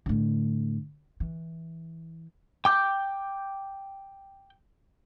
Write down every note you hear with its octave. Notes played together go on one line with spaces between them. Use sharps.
A2 D3
E3
G5 D6 G6